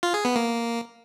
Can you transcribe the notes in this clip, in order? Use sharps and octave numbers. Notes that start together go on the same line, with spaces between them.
F4
G#4
B3
A#3